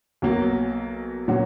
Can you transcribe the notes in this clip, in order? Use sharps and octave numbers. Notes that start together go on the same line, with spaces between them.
B1 B2 F#3 A#3
A#2 F#3 C#4 F#4